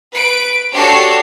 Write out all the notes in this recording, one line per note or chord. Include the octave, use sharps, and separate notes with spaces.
B4 D7
D4 F#4 G4 A4 C#5 C7